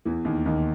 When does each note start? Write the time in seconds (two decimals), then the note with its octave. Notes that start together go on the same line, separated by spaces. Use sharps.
0.05 E2 E3
0.25 D#2 D#3
0.46 D#2 D#3